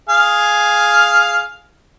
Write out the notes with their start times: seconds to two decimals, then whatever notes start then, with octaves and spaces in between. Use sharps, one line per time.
0.09 G#4 F5